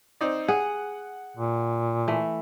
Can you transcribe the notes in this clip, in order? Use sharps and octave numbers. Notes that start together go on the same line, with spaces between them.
C4 D#4 D5
G#4 F#5
A#2
E3 A3